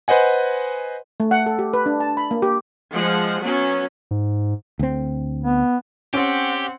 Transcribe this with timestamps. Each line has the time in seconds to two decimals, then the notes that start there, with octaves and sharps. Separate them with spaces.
0.08 B4 C5 D#5 F#5 G#5
1.20 A3
1.31 F#5
1.46 A4
1.59 G4
1.74 B4
1.86 D4
2.00 A5
2.17 B5
2.31 A#3
2.42 G4
2.94 F3 G#3 F#5
3.44 F#3 B3 C#4
4.11 G#2
4.79 D2 C4
5.43 B3
6.14 C4 C#4 G4 F#5